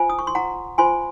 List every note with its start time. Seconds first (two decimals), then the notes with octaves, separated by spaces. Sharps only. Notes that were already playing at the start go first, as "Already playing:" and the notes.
Already playing: F4 C5 G#5
0.10 D#6
0.19 C#6
0.27 C6
0.35 F#5 A#5
0.78 F4 C5 G#5 C6